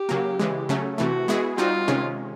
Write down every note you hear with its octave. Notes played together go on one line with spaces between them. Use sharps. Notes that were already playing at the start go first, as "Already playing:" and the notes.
Already playing: G4
C#3 F#3 A#3
C#3 E3 G#3
C#3 F#3 A3 C#4
C3 E3 A3 F#4
G#3 B3 E4 G#4
G3 C4 D#4 F4 F#4
C3 D#3 G#3 C#4